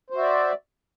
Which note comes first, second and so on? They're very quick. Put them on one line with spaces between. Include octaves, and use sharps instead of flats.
C5 F#4 E5 D5